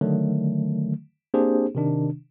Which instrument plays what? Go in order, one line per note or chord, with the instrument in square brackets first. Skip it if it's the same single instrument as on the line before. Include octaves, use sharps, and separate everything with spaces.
[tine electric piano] D3 D#3 F#3 A3
A#3 C4 D4 G4 G#4 C5
C3 D#3 D4